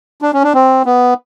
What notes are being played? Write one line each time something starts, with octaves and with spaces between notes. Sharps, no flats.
D4
C#4
D4
C4
B3